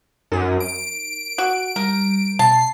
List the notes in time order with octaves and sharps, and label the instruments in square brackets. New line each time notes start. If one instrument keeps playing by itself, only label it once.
[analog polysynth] F#2 [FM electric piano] D#4 A#4
[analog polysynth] D7
[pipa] F#4
[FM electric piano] G3 [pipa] A#4
[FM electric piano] B2 [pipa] A5 [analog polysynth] C7